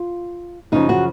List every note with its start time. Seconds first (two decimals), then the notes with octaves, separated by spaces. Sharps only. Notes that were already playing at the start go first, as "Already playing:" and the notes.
Already playing: F4
0.72 F#2 C#3 F3 D#4
0.89 F#4